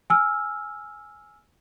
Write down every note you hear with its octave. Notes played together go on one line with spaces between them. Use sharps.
G#5 E6 F6